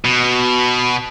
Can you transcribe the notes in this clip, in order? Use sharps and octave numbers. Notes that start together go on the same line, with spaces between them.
B2